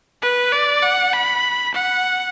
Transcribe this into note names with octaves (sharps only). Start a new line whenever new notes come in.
B4
D5
F#5
B5
F#5